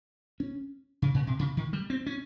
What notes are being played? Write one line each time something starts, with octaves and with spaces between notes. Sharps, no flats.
C#4
C#3
A#2
C3
C#3
D#3
G3
C4
C#4